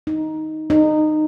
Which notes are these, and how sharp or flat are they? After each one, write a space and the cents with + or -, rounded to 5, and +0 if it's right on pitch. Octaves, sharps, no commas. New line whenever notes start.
D#4 +5
D#4 -20